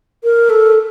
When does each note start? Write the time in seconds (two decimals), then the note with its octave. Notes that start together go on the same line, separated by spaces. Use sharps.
0.24 A#4
0.50 A4